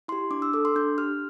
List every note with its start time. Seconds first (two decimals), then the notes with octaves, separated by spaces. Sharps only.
0.08 E4 C6
0.12 G4
0.31 D4 D6
0.42 E6
0.53 A4 D6
0.65 C6
0.75 D4 G6
0.98 G4 F6